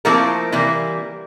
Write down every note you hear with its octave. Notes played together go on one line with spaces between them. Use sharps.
F3 A3 A#3 C4 E4 A#4
C3 E3 G3 A#3 E4